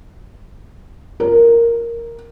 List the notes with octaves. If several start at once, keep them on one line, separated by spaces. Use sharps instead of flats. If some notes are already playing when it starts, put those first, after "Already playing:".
A#4